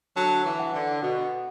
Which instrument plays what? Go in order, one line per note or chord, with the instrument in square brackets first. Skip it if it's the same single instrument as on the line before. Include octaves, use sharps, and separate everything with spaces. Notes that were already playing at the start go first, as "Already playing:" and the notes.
[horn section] D3 F#3 [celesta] A5
[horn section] E3
[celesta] F#5
[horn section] D3
[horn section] B2 [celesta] F#5